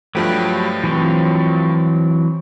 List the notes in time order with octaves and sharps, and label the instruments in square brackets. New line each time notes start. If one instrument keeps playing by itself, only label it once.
[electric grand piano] G2 F3 A3 [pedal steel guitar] F#3 G4 B4
[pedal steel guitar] E3 F#3 C4